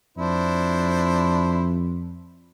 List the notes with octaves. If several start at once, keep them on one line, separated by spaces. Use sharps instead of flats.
F2 D4 E4 C5